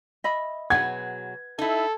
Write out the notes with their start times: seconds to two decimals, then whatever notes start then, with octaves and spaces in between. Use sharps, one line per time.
0.24 D#5 E5 B5
0.70 B2 F#3 G#4 B4 F#5 G#6
1.59 D#4 E4 A4